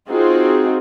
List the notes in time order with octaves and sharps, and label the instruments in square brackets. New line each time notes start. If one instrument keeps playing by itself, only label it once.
[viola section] C4 D#4 F4 F#4 G#4